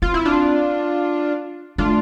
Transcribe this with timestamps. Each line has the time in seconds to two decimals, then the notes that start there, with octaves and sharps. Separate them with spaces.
0.02 C4 F4
0.14 E4
0.25 D4 F4
1.78 A3 D4 F4